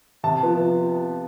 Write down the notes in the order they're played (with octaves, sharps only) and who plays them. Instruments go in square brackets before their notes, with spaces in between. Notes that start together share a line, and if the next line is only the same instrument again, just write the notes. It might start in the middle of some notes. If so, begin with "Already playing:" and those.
[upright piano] C3 A5
F3 B3